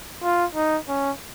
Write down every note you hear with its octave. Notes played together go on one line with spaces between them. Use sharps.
F4
D#4
C#4